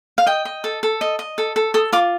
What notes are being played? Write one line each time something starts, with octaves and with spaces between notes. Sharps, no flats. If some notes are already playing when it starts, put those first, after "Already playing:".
F5
D#5 G5
D#5
A4
A4
D#5
D#5
A4
A4
A4 D#6
F4 D6